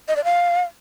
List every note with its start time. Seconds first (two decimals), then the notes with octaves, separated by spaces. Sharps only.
0.08 D#5
0.16 D5
0.24 F5